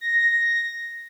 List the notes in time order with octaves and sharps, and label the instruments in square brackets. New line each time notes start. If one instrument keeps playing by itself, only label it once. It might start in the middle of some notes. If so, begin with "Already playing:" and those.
[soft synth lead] A#6